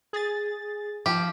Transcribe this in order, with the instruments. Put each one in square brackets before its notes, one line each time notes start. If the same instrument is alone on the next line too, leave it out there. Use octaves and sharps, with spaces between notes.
[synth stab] G#4 A6
[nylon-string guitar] F3 [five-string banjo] G4